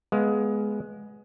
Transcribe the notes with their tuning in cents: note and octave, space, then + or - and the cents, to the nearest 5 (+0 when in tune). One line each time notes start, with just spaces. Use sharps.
G#3 +15 B3 +0 F5 +0